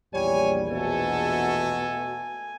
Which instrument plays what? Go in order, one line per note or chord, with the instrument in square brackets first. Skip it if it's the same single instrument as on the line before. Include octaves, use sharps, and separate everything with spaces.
[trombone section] A#1 E2 [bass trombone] G3 [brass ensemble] C#5 G#5
[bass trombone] B2 [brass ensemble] A3 F#4 A4 [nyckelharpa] G#5